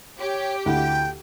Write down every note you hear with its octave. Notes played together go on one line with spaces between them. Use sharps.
G4 C#5
D2 E4 F#5 G5